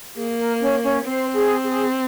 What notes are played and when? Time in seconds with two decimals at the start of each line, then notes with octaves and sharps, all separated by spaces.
0.16 A#3 G#4
0.38 A#4
0.60 C#4 C#5
0.82 C#4 C#5
1.05 C4 C5
1.35 G#4
1.64 G#4